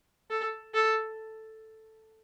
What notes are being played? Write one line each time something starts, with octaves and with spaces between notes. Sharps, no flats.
A4
A4